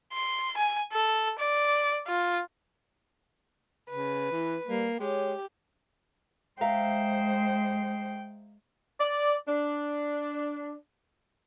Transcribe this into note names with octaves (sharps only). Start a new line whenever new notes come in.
C6
G#5
A4
D5
F4
C#3 B4
E3 E4
G3 A#3
G#3 G4 C#5
G#3 C5 E5 F5 G5 A#5
D5
D4